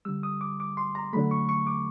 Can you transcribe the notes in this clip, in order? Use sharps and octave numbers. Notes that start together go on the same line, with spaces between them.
D3 G3 E6
D#6
D6
D6
C6
A#5
D3 F#3 A3 B5
C#6
C#6
D6